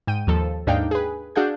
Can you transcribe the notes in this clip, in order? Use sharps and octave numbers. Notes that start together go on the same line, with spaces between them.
G#2 G5 D#7
D#2 F3 A4
D#2 G#2 D4 D#4 F5 G5
G#4 B4
D4 F#4 G#4 F5 F#5 G6